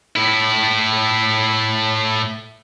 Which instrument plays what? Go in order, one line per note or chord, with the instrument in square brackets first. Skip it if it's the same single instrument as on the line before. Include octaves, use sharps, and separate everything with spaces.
[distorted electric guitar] A2 E4